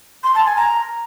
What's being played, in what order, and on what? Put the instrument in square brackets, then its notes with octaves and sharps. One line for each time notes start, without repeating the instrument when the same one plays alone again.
[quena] C6
A5
G#5
A#5